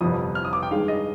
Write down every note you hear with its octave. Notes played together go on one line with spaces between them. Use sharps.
G1 F2 C3 F3 B3 D#6
F6
D#6
D6
G5
G2 D#3 G#3 F5
D#5